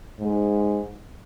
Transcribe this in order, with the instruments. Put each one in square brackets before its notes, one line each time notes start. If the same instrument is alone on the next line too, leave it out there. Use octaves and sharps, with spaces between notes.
[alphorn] G#2